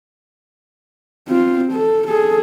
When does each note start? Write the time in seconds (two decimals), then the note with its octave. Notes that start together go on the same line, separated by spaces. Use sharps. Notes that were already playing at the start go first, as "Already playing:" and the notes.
1.28 C4 F4
1.72 A4
2.07 G#4 A4